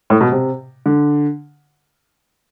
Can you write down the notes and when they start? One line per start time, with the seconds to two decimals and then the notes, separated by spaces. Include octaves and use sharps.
0.10 A2
0.21 B2
0.32 C3
0.86 D3